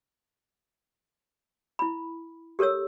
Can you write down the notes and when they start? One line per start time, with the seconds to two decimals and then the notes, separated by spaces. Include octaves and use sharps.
1.79 E4 B5
2.59 G4 A4 A#4 C#5 E6